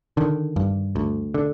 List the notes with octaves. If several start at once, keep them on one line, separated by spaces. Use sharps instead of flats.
D3 D#3
G2
D2
D3